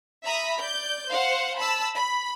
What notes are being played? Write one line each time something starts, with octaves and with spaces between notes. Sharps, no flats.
E5 A#5 B5 D#6
D5 G6
C5 F5 F#5
A5 B5 E6
B5